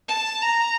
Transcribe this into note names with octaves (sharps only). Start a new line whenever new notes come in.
A5
A#5